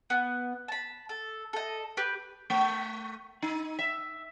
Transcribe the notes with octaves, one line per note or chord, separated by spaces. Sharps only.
B3
A5 B5
A4
A4 D#5
G4 B4
A3
D#4
E5